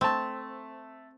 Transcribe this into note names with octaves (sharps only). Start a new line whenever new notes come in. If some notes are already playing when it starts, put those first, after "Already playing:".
A3 C4 A5